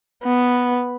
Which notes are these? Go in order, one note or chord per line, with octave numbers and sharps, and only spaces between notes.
B3